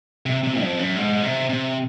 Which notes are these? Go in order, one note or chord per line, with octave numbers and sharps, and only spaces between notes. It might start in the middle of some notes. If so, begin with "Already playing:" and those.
C3
C3
F2
F#2
G#2
C3
C3